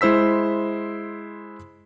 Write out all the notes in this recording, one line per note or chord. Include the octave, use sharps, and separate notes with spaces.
G#3 E4 C5 E6 B6